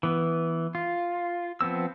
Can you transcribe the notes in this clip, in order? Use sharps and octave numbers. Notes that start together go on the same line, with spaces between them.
E3 B3
F4
F3 B3 C4 E6